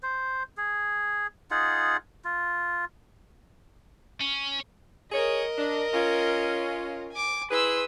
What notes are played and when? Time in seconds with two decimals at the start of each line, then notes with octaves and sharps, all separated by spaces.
0.03 C5
0.57 G#4
1.51 D#4 F4 G#4 F#5
2.25 F4
4.21 C#4
5.12 G#4 A#4 C#5 D#5
5.58 D4
5.94 C#4 F4
7.12 G#5 D6
7.51 E4 G#4 B4 C6 E6